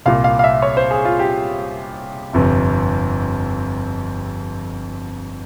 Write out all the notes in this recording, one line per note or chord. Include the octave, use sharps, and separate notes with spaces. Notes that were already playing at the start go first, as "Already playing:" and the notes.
C2 A#2 F5
F5
F5
E5
C#5
C5
G#4
F4
G4
G1 F2 C3